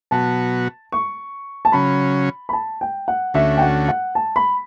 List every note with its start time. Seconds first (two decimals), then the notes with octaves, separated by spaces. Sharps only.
0.11 B2 F#3 B3 F#4 A5
0.92 C#6
1.65 A5
1.72 C#3 F#3 C#4 B5
2.49 B5
2.53 A5
2.81 G5
3.08 F#5
3.34 D2 D3 A3 C#4 F#4 E5
3.57 G5
3.61 F#5
3.89 F#5
4.15 A5
4.36 B5